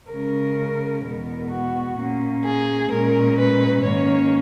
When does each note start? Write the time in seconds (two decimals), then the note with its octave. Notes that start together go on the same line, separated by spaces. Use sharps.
0.11 C#3 G#3 C#4 A#4
1.05 E2 B2 G#3 B3 A#4
1.51 F#4
1.98 A#2 A#3 C#4
2.45 G#4
2.91 A#2 G#3 C#4 A#4
3.38 B4
3.84 G#2 D#3 A#3 C#4 C#5